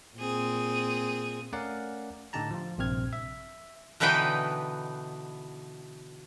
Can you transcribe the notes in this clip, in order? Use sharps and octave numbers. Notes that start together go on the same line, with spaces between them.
A#2 C4 G#4
A3 C#4 A#4 D5 F5 F#5
A2 D3 D#4 G4 A5 A#5
F3 F4
A#1 G2 C3 C4 F6 G#6
E5
B2 D3 E3 D#4 B4 G5